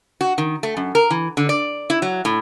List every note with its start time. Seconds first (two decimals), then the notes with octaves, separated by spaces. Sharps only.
0.21 F#4
0.38 D#3
0.63 A3
0.77 F#2
0.95 A#4
1.10 E3
1.37 D3
1.49 D5
1.90 E4
2.02 F#3
2.25 A2